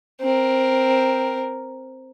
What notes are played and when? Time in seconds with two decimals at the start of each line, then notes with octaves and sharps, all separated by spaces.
0.21 C4 A#4